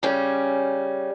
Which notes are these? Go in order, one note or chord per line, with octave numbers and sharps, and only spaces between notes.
C#3 G3 C#4